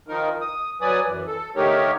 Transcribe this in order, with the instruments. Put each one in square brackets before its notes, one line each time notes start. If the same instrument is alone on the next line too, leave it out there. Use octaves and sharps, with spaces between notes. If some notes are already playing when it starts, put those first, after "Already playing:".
[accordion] D#3 F3 D#4 A#4
D#6
F#3 B4 D5 G#5 D#6
F#2 E3
A4
D3 A3 D#4 G4 A#4 C#5